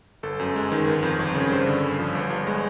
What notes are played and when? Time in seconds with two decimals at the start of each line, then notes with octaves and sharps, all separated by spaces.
0.23 G1 A4
0.39 F#2
0.56 G#3
0.72 D#3
0.87 G1 A#4
1.03 F2
1.19 G1
1.34 C#3
1.51 G2 C5
1.67 D3
1.83 G2
1.99 F3
2.15 G1
2.30 G2
2.47 G#3